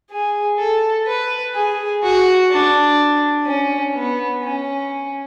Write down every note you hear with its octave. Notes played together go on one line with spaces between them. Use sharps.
G#4
A4
B4
G#4
F#4
D4
C#4
B3
C#4